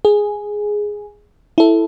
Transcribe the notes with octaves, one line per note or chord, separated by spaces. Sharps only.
G#4
E4 A4